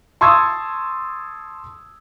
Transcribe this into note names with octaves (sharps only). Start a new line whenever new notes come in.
A5 C6 C#6 D#6 E6 G#6